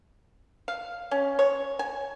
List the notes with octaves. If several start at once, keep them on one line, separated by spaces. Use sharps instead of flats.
F5
C#4
C#5
G#5